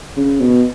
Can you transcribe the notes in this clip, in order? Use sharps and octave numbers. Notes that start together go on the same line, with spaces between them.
C#3
B2